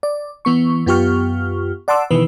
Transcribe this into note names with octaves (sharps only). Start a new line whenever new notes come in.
D5
E3 B3 C#6
F#2 B3 F4 G4 C#6 F6
D5 F#5 A5 C6 D6 E6
B2 D#3 E3 B4